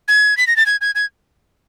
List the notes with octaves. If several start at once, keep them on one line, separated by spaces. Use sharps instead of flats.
G#6
B6
A#6
A6
G#6
G#6
G#6